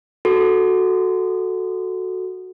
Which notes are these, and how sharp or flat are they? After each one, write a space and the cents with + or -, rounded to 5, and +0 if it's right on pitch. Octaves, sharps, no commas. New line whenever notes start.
F#4 +0 A4 +0